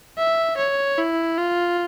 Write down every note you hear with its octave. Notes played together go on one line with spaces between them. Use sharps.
E5
C#5
E4
F4